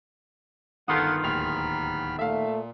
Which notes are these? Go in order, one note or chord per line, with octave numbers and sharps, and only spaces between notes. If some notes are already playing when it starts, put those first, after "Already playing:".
G1 D#3 B3 F4 A4 F#5 D#6
D1 D#2 B5 F6 F7
A#2 A3 E5 F5